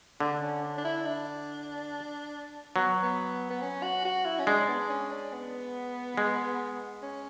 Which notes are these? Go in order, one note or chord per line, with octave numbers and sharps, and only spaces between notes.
D3 D4
C#4
D4
D4
E4
D4
F#3 B3
B3
B3
C#4
F#4
F#4
E4
C#4
G#3 D4
B3
D4
C#4
D4
B3
G#3
C#4